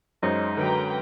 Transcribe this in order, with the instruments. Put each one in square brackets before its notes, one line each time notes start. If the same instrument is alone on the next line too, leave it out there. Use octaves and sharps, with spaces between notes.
[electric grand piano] F#2 G#3 [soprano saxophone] D#4 [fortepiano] C5 C#5
[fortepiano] D3 F#3 [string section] B4 G5 A#5